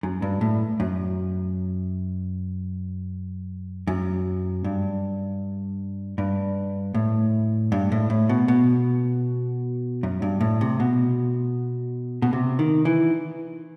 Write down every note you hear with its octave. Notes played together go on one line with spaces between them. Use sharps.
F#2
G2
A2
F#2
F#2
G2
G2
A2
G2
A2
A2
B2
B2
F#2
G2
A2
C3
B2
B2
C3
D#3
E3